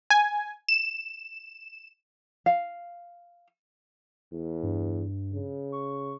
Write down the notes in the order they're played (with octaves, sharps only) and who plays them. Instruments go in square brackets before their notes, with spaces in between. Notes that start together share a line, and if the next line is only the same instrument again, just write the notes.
[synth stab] G#5
E7
[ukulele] F5
[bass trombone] E2
[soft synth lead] G2
[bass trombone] C#3
[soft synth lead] C#6